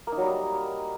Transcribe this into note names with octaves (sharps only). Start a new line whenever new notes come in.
A#3
D#4
F#3
G3
D#4